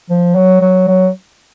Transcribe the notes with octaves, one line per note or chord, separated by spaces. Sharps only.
F3
F#3
F#3
F#3